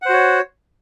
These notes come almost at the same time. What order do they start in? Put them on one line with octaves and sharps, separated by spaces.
F#5 C5 F#4 C#5